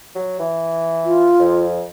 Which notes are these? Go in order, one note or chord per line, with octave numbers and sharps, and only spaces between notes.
F#3
E3
F4
F2